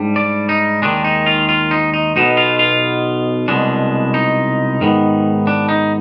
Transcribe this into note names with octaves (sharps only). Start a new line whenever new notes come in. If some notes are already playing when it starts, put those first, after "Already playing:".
Already playing: G#2 G3 D4
D5
D#4
D#2 D#3 G#3 D4
D#4
F4
F4
D#4
D#4
B1 B2 B3 D#4
F4
F4
C2 B2 G#3 D4
D#4
G#2 D#3 B3
D4
D#4